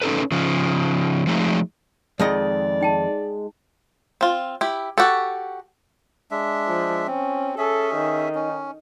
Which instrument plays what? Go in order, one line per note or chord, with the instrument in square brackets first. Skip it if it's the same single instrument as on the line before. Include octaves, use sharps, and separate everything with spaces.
[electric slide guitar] C#4 D#4 A4 B4
C#3 F3
F3 F#3 G#3 A3 D#4
[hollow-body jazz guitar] F2 D#3 D#5 [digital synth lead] G#3 [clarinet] D5
[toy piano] D#4 G5 A5
[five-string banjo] C4 F4
E4 G4
F#4 G4 A4
[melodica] G#3 D4 E5
[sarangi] F3
[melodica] C4 [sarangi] C#4
[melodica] C#4 G#4 E5 [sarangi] A4
[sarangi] D#3
[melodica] C#4